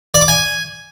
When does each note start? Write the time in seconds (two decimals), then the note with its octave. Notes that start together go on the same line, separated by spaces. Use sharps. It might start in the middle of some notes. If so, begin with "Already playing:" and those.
0.14 D5
0.21 D6
0.28 G#5